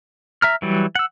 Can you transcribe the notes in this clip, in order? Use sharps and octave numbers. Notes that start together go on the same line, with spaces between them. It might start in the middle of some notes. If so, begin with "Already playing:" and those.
E5 A#5 F6
E3 F#3 G3
F#5 E6